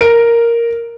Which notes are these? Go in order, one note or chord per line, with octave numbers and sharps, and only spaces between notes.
A#4 D7